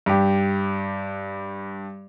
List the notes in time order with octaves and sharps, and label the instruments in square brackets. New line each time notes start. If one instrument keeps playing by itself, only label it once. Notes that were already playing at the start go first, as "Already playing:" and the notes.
[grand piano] G2 G4